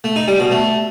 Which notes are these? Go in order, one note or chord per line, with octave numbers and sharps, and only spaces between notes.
A3
D#4
G3
B2
A3